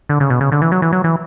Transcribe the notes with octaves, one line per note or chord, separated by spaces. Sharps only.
D3
C#3
B2
C#3
D3
E3
F#3
E3
F#3
E3